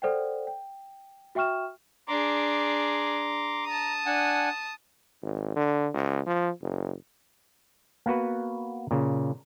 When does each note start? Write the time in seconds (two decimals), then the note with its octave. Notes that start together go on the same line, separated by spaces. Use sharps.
0.02 A4 C5 D5 F#5 G5
0.47 G5
1.35 F#4 E5 G5 C#6 F6 E7
2.08 D4 G#4 A#5 C6 D6
3.66 A5 A#5 D#6
4.06 D4 F#5 G#5
5.22 G#1
5.56 D3
5.94 C#2
6.26 F3
6.61 F#1
8.06 A#3 B3 F#4 B4
8.91 A#2 C#3